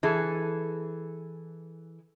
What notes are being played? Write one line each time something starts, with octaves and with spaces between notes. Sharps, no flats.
E3 G#4 A4